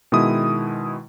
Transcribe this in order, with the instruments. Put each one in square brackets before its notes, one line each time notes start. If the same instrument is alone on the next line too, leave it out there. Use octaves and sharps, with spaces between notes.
[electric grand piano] B2 D#3 G#3 E4 D#6